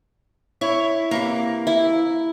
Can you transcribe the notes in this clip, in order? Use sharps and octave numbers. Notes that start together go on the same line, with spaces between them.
E4 C#5 E5
C3 E3 A#3
E4